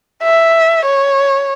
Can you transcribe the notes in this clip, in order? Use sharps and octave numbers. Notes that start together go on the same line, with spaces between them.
E5
C#5